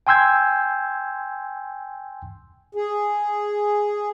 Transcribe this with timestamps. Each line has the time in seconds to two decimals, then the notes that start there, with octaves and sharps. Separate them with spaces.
0.07 G5 G#5 C6 E6 G6 G#6
2.75 G#4